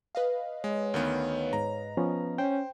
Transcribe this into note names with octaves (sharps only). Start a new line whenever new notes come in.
B4 D#5 F5
G#3 C#5
D2 D#3 B3
G#2 A#5
F3 B3 C#4
C#4 C5 G5